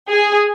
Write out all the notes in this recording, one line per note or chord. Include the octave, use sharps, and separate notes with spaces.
G#4